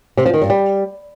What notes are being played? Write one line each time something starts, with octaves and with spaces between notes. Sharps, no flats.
C3
F3
D#3
G2
G3